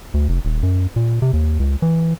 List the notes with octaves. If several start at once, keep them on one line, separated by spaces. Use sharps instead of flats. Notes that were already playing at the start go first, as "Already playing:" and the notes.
D2
F1
D#1
F#2
A#2
C3
D#2
C#2
E3